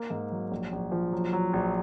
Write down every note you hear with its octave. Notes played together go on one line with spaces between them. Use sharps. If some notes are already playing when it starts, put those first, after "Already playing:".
Already playing: A#3
G#2
F#3
A#1
A#1
F3
F#3
F#3
A#1